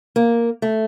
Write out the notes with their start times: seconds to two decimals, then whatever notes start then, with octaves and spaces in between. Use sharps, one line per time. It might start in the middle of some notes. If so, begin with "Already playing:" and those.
0.16 A#3
0.62 A3